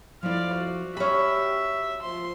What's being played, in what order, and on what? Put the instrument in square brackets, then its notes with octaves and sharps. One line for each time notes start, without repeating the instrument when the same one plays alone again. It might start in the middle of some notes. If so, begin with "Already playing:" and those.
[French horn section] F2 C5 [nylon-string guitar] F3 E4 [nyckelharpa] D5 F5
[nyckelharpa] F#4
[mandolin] C#4 B5 [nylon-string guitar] F#4 C#5 [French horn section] G4 [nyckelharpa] E5
[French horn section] F3 [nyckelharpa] C6